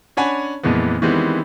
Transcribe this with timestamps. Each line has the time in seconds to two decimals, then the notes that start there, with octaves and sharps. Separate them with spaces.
0.17 C#4 D4 C#5 F#5 G#5 B5
0.63 F2 A#2 E3 G#3 B3
1.02 D#3 E3 G3 G#3 B3 C4